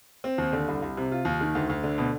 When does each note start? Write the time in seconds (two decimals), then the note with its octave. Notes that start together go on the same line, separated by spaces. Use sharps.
0.24 C4
0.38 D#2
0.53 D3
0.68 C2
0.82 C2
0.97 C3
1.12 F4
1.25 D#2
1.41 D#3
1.55 D2
1.69 D2
1.83 D3
1.98 B2